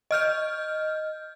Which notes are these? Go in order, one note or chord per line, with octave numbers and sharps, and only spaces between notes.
D#5 F6 G6